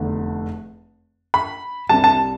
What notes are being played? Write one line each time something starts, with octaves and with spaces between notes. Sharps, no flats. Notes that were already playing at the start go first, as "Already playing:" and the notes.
Already playing: F1 E2 D3 A3
B5
C2 C3 G3 A5
A5